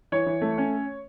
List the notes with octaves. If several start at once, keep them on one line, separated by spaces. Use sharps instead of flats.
E3 C#5
E3
A3
C#4